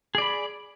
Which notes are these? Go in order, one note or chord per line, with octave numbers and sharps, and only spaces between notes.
G#4 D5 B5